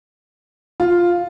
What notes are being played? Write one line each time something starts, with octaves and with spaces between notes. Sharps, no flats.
F4